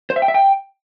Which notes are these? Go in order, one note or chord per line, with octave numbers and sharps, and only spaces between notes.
C5
E5
G5
E5
G5